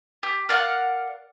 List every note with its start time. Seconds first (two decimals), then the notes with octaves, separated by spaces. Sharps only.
0.23 G4
0.49 A#4 D5 F5 F#5